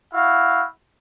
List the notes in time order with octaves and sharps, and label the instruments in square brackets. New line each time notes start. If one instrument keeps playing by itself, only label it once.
[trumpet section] E4 F#4 F5